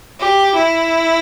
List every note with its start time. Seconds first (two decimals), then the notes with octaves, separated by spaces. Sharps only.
0.20 G4
0.56 E4